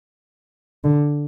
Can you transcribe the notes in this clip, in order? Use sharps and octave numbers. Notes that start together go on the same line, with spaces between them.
D3